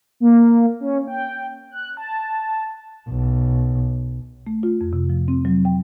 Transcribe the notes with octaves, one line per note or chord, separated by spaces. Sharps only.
A#3
C#4
G5
F#6
A5
B1
A3
F4
F2
C3
F3
C4
F#3
G5